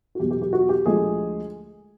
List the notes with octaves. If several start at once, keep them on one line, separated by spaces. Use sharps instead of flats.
F#4
E2 B2 F#3 G4
G4
G4
F#4
G4
D2 D3 F3 G#3 G#4